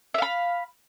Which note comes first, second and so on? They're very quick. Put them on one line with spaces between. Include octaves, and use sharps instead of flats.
E5 F5 B5